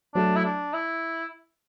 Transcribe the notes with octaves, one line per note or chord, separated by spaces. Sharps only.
F#3 A3 D4
E4
D4
E4